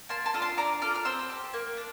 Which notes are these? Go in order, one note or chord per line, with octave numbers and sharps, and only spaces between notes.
A#3 A5 C6
A5 C6
D4 F4 A4
A5 C6
D4 A#5 D6
F4 A4 D6 F6
F6
C4 C6 E6
G4
A#3
D4